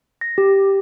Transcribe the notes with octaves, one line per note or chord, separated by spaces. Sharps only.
A#6
G4